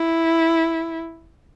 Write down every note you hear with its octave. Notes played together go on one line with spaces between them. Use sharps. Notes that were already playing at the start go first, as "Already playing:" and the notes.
Already playing: E4